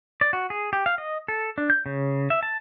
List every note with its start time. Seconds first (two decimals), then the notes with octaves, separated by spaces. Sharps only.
0.21 D5
0.33 F#4
0.50 G#4
0.73 G4
0.86 F5
0.98 D#5
1.28 A4
1.58 D4
1.70 G6
1.86 C#3
2.30 E5
2.43 A5